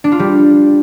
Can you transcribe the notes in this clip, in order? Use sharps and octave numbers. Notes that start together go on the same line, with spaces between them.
D4
F4
G3